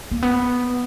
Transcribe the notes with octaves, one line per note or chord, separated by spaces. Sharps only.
A#3
B3